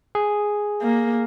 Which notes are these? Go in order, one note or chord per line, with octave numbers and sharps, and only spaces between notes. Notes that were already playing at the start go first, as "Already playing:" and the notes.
G#4
A#3